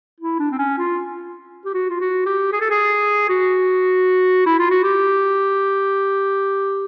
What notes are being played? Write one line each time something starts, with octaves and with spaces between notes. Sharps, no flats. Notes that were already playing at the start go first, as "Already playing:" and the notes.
E4
D4
C4
C#4
F4
G4
F#4
F4
F#4
G4
G#4
A4
G#4
F#4
E4
F4
F#4
G4